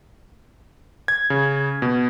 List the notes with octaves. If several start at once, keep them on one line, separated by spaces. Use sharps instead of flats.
G#6
C#3
B2